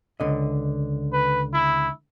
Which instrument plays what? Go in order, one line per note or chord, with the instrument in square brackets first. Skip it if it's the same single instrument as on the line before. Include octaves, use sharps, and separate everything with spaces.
[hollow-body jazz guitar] C#2 D3 D#5
[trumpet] B4
E4